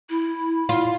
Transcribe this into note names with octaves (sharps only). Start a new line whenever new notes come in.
E4
F4